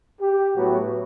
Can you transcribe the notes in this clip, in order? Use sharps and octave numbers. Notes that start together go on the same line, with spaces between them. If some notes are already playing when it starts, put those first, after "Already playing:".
G4
A2 F#3 B3 F#4